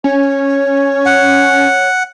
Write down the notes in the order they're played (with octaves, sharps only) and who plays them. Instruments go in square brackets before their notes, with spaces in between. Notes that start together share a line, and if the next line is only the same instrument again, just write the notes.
[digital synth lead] C#4 [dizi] C#5
[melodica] F#5